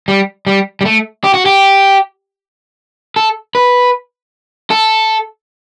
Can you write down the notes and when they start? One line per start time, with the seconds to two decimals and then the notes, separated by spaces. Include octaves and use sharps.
0.08 G3
0.47 G3
0.81 G3
0.85 A3
1.24 G4
1.34 F#4
1.46 G4
3.16 A4
3.55 B4
4.71 A4